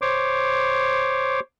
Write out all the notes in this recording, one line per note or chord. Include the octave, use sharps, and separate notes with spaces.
C5 C#5 D6